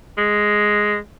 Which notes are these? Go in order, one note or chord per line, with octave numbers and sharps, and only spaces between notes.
G#3